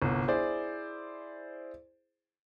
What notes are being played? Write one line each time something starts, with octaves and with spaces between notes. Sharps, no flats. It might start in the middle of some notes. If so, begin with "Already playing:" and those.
G1 C2
E4 G#4 C5 D5